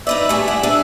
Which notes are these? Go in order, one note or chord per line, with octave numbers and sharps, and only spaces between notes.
D#4 B4 D5 E5
G3 A3 G#4
E4 D5 F#5
D4 G#4